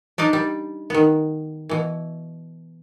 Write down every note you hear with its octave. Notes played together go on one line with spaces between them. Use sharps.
D4 D#4 D5 D#5
G3
D#3 B3
B2 E3